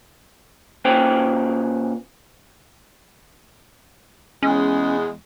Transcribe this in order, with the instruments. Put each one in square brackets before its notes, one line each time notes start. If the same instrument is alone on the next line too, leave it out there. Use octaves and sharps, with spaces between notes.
[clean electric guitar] A#2 C#4 B4 C5 G5
[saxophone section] E2 G#3 [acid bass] C#4